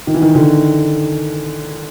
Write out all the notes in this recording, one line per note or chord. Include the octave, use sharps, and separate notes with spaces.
D#3
E3
D#3
D3